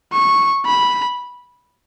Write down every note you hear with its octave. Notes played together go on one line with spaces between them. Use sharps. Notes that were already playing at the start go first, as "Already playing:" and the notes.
C#6
B5